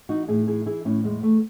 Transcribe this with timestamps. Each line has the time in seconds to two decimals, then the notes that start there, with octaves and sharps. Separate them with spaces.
0.09 E3 D#4 F#4
0.28 A2 E4 G#4
0.46 E3 E4 G#4
0.66 E3 E4 G#4
0.85 A2 C#4 E4
1.04 E2 G#3
1.23 E2 A3